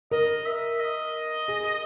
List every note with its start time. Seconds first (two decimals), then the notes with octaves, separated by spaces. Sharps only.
0.11 A#4 D#5
0.46 E5
0.80 D#5
1.48 G#4